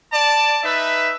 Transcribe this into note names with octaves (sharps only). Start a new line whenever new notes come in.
D5 A5
D#4 B4 E5